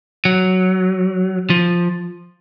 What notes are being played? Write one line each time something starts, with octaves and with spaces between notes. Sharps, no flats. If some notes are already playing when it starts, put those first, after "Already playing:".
F#3
F3